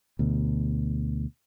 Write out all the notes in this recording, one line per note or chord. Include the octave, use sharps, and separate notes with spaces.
D2 B2